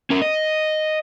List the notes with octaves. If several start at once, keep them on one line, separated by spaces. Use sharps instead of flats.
C#4 A#4
D#5